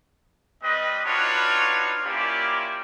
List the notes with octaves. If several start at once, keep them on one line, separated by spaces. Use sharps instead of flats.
G3 C4 B4 D#5
D4 D#4 F4 F#4 B4 C#5
A#3 C#4 E4 F4 G4 D5